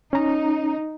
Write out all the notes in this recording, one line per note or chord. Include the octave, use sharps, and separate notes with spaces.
C#4 D#4 A#5